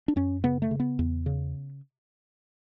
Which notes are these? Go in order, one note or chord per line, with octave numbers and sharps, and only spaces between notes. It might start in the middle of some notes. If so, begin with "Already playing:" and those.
D4
F#2 C#4
C#3 B3
A3
C#3
B3
E2
C#3